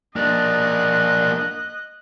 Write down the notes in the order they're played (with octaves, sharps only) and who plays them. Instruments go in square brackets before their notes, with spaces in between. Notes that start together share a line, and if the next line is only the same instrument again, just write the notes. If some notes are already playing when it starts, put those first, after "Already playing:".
[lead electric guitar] A#3 D4 [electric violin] D#5 F#6